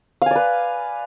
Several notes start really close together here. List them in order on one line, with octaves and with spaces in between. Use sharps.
F5 G#5 D5 B4